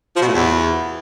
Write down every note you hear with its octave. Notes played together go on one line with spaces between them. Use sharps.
F3
B2
A2
E2